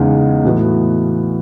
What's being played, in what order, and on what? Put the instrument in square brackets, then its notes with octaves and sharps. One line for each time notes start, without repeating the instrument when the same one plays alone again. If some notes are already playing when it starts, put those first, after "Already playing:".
Already playing: [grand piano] E2 C#3 G#3 D#4
A2 E3 B3 F#4